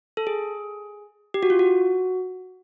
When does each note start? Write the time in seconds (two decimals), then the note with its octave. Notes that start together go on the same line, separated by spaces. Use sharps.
0.17 A4
0.27 G#4
1.34 G4
1.43 F#4
1.50 F4
1.59 F#4